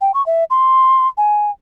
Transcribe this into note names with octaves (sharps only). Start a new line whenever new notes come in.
G5
C#6
E5
C6
G#5